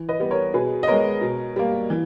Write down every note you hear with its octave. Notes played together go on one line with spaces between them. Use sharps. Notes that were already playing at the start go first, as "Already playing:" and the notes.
Already playing: E3
B4 D#5
G3 B3
A#4 C#5
B2 G#4 B4
D#5
G#3 B3 A#4 C#5
B2
G3 A#3
E3